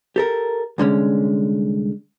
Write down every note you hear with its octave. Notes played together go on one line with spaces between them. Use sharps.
G4 A4 A#4
C2 D3 G#3 C#4